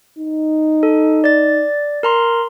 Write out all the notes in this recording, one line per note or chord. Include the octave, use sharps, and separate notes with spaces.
D#4
A4
D5 A6
A#4 A#5 C6